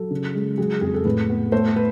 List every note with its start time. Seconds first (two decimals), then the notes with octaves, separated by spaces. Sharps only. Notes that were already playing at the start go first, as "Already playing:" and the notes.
Already playing: F#3 A4
0.11 C#3
0.35 G#3
0.58 F#3 G#4
0.81 F2 G#4
0.94 A4
1.05 A2 B4
1.30 B3
1.52 A3 C5
1.76 B4